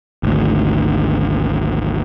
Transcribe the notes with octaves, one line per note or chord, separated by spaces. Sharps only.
G#1 D2